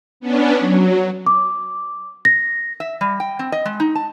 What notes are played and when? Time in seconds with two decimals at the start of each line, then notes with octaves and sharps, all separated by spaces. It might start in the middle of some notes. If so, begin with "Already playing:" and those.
0.20 B3 C#4 D4
0.60 F#3
1.26 D6
2.25 A#6
2.80 E5
3.01 G3
3.20 G5
3.39 C4
3.52 D#5
3.65 G#3
3.80 D#4
3.95 A5